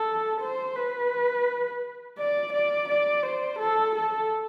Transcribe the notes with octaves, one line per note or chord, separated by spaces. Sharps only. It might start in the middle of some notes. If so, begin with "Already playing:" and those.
Already playing: A4
C5
B4
D5
D5
D5
C5
A4
A4